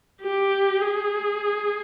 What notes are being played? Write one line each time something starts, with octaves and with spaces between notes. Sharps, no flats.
G4
G#4